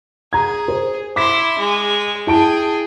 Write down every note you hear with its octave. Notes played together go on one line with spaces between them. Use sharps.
G#4 A#5 G#6
C5
E4 C6 D6 B6
G#3
E4 G#4 G5 A5 D7